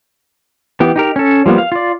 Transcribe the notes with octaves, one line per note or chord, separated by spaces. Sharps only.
E3 B3 G4
D#4 G4 A#4
C#4 A4
F3 G3 A#3 B3
F5
F4 D5